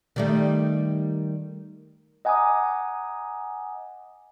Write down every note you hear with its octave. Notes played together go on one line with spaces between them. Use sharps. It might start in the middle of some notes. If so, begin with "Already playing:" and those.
D#3 G3 A3
D#5 F#5 G#5 A#5 D6 D#6